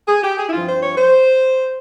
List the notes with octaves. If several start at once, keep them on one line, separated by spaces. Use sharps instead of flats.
G#4
G4
G#4
E4
G2 F3 C4 F4
C5
C#5
C5